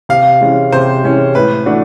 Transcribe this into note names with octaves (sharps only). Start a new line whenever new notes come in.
C3 F5
E3 G#3 C#4
C3 C5
E3 G#3 C#4
A2 B4
E3 A3 D4 F#4